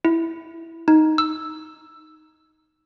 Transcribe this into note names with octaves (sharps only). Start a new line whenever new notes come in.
E4
D#4
E6